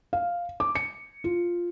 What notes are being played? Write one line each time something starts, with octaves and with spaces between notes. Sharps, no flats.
F5
D6
C#7
F4